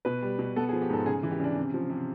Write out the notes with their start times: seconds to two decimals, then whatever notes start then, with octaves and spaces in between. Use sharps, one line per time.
0.05 B2 B4
0.22 G3
0.39 B2
0.56 B3 A4
0.69 G#4
0.73 F3
0.82 G4
0.89 G#2 A4
1.06 C#3 G#4
1.23 E3
1.31 G4
1.40 C#3 D4
1.56 C3
1.74 F3
1.90 C3